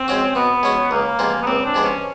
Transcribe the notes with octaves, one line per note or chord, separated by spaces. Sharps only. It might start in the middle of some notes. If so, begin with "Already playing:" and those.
Already playing: C4
G#3 C#4 F#4
B2 B3
G#3 C#4 F#4
C#2 A#3
C3 F3 G#3 B3
B3
C#2 C4
D4
C3 F3 G#3 B3
C#4